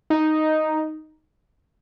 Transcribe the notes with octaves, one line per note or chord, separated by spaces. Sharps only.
D#4